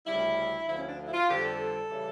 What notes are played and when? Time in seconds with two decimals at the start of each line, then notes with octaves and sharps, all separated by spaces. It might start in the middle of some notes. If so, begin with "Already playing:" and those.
0.07 D2 C#3 G3 E4
0.68 D2 D3 F3 E4
0.78 C#4
0.89 D4
1.08 E4
1.13 F4
1.29 F2 D3 G3 G4
1.45 A4
1.90 C#3 E3 G3